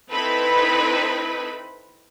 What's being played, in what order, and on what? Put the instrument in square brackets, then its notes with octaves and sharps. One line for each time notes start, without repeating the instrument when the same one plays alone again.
[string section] C4 D#4 E4 A4 B4 B5